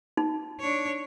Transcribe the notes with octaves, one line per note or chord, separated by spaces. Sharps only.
D#4
D4 C#5